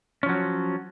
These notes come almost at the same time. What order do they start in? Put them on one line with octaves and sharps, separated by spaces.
C#4 F3 F#3